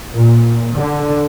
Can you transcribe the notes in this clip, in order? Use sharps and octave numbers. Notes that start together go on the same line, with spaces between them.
A#2
D3